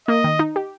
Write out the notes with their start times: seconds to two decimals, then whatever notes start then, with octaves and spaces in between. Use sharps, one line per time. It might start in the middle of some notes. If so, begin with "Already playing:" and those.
0.08 A#3 D#5
0.24 D#3
0.39 D#4
0.56 G4